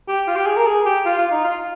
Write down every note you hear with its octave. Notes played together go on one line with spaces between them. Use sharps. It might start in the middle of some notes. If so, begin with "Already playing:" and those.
G4
F4
G4
G#4
A#4
G#4
G4
F4
F4
D#4
F4